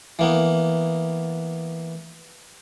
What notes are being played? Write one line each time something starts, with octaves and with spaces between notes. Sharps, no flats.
E3 A#3 B3